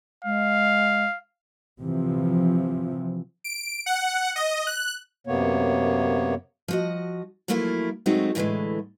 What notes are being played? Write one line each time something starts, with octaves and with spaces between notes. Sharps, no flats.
G#3 F5
C3 E3 F3
D7
F#5
D#5
F#6
F#2 C3 A#3 B3 C#5
F3 F#4 D#5
F3 F#3 A3 A#3 E4 F4
F#3 G#3 A3 C4 D#4 F#4
A2 D3 E3 F#3 G#3 A3